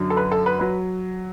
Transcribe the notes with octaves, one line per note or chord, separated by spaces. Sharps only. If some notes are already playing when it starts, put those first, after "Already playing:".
Already playing: F#2 D3 F#3
A4
B4
A4
B4
F#3 B4